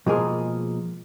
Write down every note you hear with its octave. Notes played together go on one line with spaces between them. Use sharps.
B2 F3 G#3 A#3 G#4 A#4